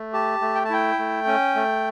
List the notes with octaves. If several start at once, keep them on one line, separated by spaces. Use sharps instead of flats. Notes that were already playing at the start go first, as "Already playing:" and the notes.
Already playing: A3
G4 A5
A3
G5
A5
E4 G5
A3
C#4
A3